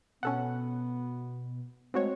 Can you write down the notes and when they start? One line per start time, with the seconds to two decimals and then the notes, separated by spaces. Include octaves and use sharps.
0.23 B2 B3 C#4 A4 F#5
1.94 G#3 A3 C4 F#4 C#5